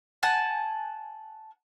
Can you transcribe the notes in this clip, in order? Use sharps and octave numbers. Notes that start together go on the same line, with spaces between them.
F#5 G#5 A5